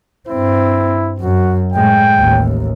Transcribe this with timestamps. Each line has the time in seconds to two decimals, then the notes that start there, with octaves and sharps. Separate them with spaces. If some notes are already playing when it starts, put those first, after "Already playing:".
0.29 G2 C4 E4
1.20 F#2 F#4
1.74 A2 G#3 G5
2.16 A1 D#2